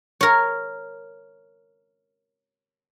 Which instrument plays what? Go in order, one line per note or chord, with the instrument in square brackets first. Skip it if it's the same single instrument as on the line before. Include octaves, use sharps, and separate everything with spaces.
[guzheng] A#4 C#5